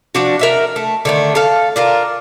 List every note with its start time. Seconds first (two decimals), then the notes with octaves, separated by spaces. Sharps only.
0.15 F3 D4 F#4
0.39 A#4 E5 F#5
0.76 A3
1.05 D3 D#3 A3
1.35 A4 F5
1.76 D4 F4 A#4